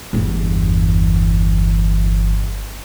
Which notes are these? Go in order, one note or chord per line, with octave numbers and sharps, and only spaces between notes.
G1 E2